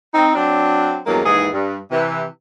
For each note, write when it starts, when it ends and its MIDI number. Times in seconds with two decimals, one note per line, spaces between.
0.13 0.34 60
0.13 0.34 63
0.35 0.98 54
0.35 0.98 60
0.35 0.98 62
1.06 1.22 40
1.06 1.22 43
1.06 1.22 54
1.06 1.22 56
1.06 1.22 58
1.25 1.48 39
1.25 1.48 44
1.25 1.48 52
1.25 1.48 68
1.53 1.77 43
1.91 2.23 48
1.91 2.23 52